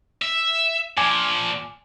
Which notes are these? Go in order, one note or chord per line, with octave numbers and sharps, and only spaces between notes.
E5
A#2 F3 G#5 D6